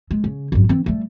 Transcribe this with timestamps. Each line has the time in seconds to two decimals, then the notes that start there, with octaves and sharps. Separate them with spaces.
0.11 G#3
0.24 C#3
0.52 G#1 F#2
0.69 E3 C4
0.86 G3 A3